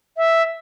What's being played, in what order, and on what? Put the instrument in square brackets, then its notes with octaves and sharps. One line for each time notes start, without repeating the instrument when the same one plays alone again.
[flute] E5